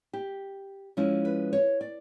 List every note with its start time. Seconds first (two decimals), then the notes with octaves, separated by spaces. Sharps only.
0.13 G4
0.97 F3 G#3 C#4 E4
1.25 B4
1.53 C#5
1.81 D5